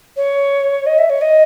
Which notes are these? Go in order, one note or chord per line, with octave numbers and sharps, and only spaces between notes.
C#5
D#5
E5
C#5
D#5